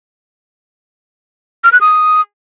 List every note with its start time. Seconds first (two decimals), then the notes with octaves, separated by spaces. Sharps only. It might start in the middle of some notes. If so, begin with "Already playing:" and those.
1.64 F6
1.72 F#6
1.81 D#6